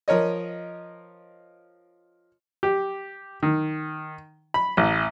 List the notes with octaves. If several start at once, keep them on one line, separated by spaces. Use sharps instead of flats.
F3 A#4 C#5 D#5
G4
D#3
B5
A1